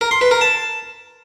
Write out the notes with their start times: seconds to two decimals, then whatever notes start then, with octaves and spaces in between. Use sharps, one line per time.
0.01 A#4
0.11 C6
0.21 B4
0.31 A#4
0.41 A5